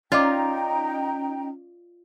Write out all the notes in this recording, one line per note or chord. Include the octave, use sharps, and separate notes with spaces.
C#4 D#4 F4 D5 D#5 G5 A#5 D6